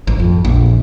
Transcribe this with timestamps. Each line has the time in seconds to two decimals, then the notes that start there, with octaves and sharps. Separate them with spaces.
0.07 G#1
0.20 F2
0.45 A#1